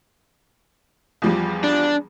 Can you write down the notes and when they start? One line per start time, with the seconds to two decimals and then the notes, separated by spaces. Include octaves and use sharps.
1.22 E2 F3 G3
1.64 D4